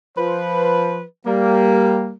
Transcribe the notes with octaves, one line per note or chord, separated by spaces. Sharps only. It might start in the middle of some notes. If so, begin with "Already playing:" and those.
F3 B4 C5
G3 A#3